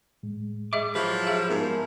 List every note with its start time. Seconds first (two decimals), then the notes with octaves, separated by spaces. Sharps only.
0.23 A2 G#3
0.73 G#4 D#5 E5 D6
0.95 F3 F#3 E4 G4 B4 C#6
1.27 G#4 E5 F5
1.49 G#2 B3 A#4 A5